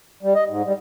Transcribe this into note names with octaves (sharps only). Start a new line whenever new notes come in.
G3
D#5
G#2
G3